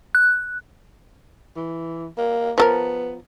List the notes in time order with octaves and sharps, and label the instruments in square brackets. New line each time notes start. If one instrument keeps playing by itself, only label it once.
[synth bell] F#6
[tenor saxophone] E3
A#3
[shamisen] F3 A4 A#4 [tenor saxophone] B3